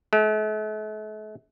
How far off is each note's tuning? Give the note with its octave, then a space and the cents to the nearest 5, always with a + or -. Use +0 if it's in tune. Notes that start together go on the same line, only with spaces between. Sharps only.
A3 -45